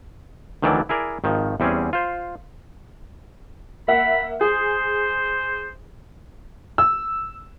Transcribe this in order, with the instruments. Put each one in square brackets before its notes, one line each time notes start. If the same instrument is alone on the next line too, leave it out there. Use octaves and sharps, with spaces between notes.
[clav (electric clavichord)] D2 D#3 E3 F#3 D5 A5
E4 G#4 A#4 D5
G#1 D#3 F3
E2 G3 C4 C#4 G#4
F4 C5
[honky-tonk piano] A#3 E5 F#5 [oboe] B5
[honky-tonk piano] G#4 [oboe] C5
[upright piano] E6